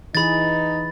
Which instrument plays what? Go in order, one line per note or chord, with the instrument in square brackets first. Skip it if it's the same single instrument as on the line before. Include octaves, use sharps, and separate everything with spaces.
[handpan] E3 G#4 [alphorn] D#4 [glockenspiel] B5 A6